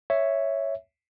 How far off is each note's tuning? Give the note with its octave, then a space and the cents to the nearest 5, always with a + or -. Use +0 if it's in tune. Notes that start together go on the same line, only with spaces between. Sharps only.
C#5 +0 E5 +0